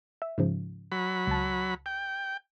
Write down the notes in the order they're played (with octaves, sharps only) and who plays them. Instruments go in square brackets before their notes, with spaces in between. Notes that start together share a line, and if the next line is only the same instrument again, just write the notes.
[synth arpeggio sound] E5
G#2 C#3 F3
[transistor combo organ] F#3 B5
[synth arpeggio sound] C#2 A5
[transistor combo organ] G5